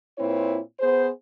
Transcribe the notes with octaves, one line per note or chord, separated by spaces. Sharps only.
A#2 C4 E4 B4 C#5
B3 G#4 C5